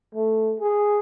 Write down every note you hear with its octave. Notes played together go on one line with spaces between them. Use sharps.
A3
G#4